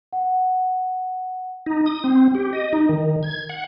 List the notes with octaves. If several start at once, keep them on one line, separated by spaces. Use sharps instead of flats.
F#5
D#4
D#6
C4
G4
D#5
D#4
D#3
G#6
F#5